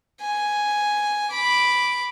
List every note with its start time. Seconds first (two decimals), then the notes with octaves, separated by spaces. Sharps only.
0.20 G#5
1.30 B5 D6